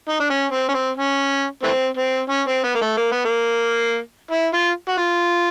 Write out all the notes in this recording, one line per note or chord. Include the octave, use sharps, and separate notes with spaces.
D#4
D4
C#4
C4
C#4
C4
C#4
E3 A3 C4
C4
C#4
C4
B3
A#3
A3
A#3
B3
A#3
E4
F4
F#4
F4